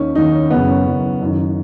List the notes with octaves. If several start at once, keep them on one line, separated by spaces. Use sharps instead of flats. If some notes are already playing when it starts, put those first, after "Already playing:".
Already playing: D#2 D#3 C#4
D#2 D#3 D#4
C#4
F#1 F#2 C#3 B3
C#4
F#1 F#2 C#3
F#1 F#2 D#3